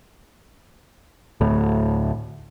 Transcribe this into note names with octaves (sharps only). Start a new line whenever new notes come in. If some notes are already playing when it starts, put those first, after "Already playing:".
D2 A2